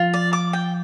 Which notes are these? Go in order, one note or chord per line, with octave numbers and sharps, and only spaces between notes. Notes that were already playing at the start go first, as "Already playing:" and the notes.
Already playing: F3 F4
D5
D6
G5